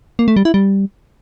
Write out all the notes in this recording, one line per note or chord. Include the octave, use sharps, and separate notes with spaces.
A#3
A3
G3
E4
G3